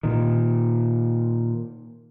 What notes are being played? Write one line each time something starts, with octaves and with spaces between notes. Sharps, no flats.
A#2 D#3